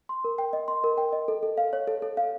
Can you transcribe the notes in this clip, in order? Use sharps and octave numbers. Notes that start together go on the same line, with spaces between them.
C6
A#4
G5
D#5
C6
A#4
G5
D#5
A4
A4
F5
C#5
A4
A4
F5